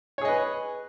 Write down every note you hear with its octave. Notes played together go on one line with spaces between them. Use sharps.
G#4 B4 C#5 D#5